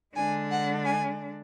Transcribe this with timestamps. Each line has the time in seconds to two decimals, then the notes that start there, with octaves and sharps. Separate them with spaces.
0.15 D3 G#3 D4 G#5
0.51 F#5
0.85 G#5